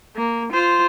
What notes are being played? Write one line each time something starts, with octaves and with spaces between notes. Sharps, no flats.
A#3
F4 C5